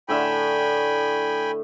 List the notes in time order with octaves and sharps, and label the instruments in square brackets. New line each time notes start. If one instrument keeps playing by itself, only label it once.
[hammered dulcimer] A2 D3 E5 [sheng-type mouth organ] G5 G#5 B5